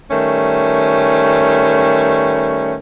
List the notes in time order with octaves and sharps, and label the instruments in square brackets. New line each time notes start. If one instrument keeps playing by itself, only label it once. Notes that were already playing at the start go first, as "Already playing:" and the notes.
[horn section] D#3 G3 A3 C#4 B4